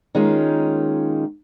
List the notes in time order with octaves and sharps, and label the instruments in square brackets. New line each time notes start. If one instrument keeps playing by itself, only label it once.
[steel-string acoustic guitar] D#3 G#3 A#3 C#4 D#4 F4